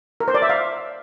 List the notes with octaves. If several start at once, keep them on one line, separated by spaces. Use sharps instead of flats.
A#4
C5
D5
E5
F5